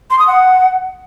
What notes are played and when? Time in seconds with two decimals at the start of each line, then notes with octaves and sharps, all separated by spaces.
0.10 C6
0.19 D#6
0.27 F#5